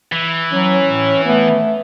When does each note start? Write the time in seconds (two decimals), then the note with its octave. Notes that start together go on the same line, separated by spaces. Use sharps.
0.12 E3
0.52 F#3 C#4
0.85 A2
1.25 A3 B3